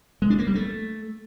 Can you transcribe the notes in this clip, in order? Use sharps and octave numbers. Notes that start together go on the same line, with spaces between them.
G#3
D4
A#3
G3
A3